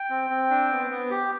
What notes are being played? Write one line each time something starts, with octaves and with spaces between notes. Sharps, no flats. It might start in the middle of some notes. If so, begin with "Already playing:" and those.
Already playing: G5
C4
C4
D4
B3
B3
G4